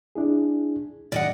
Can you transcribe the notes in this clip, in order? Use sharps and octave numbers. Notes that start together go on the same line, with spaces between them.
D4 E4 G#4
A2 D5 D#5 F#5